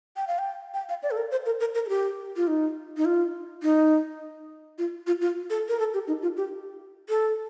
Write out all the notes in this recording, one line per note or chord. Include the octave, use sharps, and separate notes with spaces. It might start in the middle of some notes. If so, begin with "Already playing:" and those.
G5
F5
G5
G5
F5
D5
A4
A#4
C5
A#4
A#4
A#4
A4
G4
F4
D#4
D#4
F4
D#4
F4
F4
F4
A4
A#4
A4
G4
D#4
F4
G4
A4